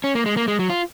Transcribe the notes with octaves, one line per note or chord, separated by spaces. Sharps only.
C#4
A#3
G#3
A#3
G#3
F#3
F4